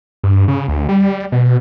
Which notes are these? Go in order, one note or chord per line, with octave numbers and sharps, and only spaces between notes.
G2
C#3
D2
G3
B2